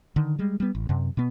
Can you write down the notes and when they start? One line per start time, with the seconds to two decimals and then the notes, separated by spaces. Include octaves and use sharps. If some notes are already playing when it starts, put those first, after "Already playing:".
0.16 D3 D#3
0.39 G3 G#3
0.60 G3 B3
0.75 A1
0.89 F#2 C3
1.17 B2 B3